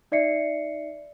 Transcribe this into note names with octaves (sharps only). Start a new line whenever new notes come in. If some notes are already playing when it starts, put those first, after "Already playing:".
D#4 D5 E5 C7 C#7